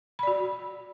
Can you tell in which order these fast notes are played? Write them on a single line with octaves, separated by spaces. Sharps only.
B5 D5 F#4